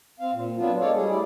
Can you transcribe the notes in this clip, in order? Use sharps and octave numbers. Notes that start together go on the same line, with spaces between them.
C4 F5
A#2
F#3 B3 C4 D4 F4
G#3 A4 C#5 D5 F5
G3 G#4
A3 E4 D5